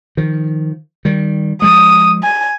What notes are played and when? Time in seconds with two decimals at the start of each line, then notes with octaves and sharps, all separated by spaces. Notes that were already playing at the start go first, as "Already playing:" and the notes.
0.17 D#3 F3
1.05 D#3 G3
1.62 F3 G#3 D#6
2.23 G#5